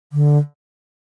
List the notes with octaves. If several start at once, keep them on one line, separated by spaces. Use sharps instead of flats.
D3